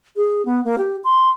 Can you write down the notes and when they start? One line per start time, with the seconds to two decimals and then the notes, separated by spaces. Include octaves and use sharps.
0.16 G#4
0.45 B3
0.64 A#3
0.78 G4
1.04 C6